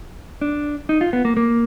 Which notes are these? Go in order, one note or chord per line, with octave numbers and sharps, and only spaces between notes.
D4
D#4
F4
B3
A#3
A#3